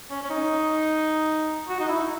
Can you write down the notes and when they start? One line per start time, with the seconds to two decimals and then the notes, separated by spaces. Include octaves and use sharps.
0.11 C#4
0.23 C#4
0.30 D#4
1.69 F#4
1.80 D#4
1.89 E4